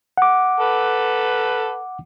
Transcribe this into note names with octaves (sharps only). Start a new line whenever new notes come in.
F#5 D6
A4 B4